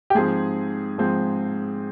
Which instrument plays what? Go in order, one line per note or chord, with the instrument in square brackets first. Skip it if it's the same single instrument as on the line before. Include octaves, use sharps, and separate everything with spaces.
[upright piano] G4
G#2 F3 G#3 C4 G#4
G#2 F3 G#3 C4